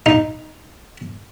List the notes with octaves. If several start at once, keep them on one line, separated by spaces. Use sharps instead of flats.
D#4